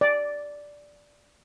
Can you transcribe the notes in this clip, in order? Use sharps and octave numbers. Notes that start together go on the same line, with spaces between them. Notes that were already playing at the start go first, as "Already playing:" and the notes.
D5